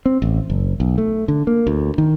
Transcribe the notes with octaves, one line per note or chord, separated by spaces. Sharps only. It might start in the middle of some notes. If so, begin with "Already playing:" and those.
C4
A1
F#1
B1
A3
D3
A#3
D2
D#3